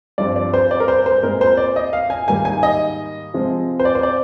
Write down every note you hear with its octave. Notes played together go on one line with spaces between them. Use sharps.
G2 F3 C4 D5
D5
C5
D5
A#4
C5
C5
A#2 G#3 C4 A#4
C5
D5
D#5
F5
G#5
G#2 D#3 G3 A#3 G#5
G#5
D#5
C3 F3 G#3 C4
C5
D5
C5
D5